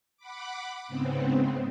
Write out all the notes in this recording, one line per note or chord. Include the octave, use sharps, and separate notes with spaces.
F#5 B5 D6
G#2 C#3 B3 C4